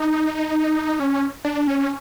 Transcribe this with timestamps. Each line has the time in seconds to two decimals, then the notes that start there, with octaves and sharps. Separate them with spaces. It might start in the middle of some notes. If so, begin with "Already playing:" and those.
Already playing: D#4
0.99 C#4
1.45 D4
1.67 C#4